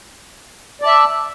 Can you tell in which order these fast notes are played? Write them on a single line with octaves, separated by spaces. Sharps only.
D5 A5 E5